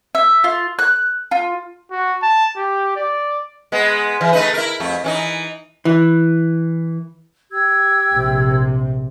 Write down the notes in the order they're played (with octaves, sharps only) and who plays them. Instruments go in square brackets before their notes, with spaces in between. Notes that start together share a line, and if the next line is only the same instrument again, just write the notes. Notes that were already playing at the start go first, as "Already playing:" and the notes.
[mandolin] E5
F4
F#6
F4
[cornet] F#4
A5
G4
D5
[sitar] G#3 B3
E3
A3 D#4 B4
E4 A#4
F2 A3
E3 C#4 D#4
[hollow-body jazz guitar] E3
[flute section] G4 E6 G#6
[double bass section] A#1 C3